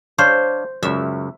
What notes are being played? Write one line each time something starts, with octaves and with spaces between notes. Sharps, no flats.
D4 C5 C#5 F5
C#2 F#2 E5